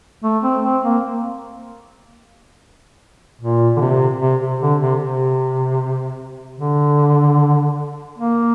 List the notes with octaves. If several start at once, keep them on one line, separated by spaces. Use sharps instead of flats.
A3
C4
C4
A#3
A#2
D3
C3
C3
C3
D3
C3
C3
D3
A#3